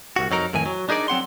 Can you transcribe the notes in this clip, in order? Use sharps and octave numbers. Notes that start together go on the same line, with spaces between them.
C2 F#4
F2 F#3 D#4 A#4
F2 A2 D#3 G#5
F#3
D4 D#4 G#4 A#4 D5
F#3 C4 F#5 C6